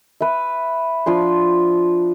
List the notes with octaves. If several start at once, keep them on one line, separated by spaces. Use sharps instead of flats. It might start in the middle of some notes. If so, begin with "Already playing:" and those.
B4 E5
F3 D4 C6